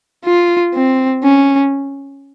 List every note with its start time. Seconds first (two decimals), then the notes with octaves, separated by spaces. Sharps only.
0.25 F4
0.74 C4
1.24 C#4